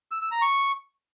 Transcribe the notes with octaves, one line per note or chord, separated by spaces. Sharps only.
E6
E6
A#5
C#6